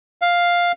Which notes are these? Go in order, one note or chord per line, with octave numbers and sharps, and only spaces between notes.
F5